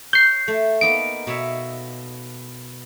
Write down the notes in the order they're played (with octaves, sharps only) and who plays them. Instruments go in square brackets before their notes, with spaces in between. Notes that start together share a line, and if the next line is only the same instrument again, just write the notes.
[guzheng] C#5 [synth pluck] G6 C7
[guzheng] A3
[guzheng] A#3 B3 D#4 [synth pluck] D7
[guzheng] B2 C#5 E5